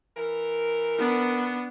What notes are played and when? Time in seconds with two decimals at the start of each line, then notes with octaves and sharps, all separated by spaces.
0.17 E3 A#4
0.99 B3 D4